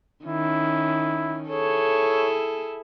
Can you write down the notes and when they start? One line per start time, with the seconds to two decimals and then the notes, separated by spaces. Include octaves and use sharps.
0.25 D#3 C#4 E4
1.49 E4 G#4 A4 C#5